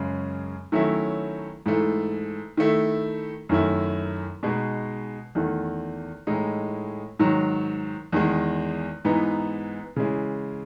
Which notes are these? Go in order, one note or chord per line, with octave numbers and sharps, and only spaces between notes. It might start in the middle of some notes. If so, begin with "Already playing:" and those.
Already playing: F#2 C#3 G#3
D#3 F#3 A3 C#4 E4
G#2 E3 A3
D#3 A3 E4
F#2 D#3 A3 E4
B2 G#3 D#4
E2 D#3 A3
A2 E3 G#3 D#4
G#2 D#3 F#3
E2 D#3 G#3
G#2 E3 B3 D#4
C#3 E3 G#3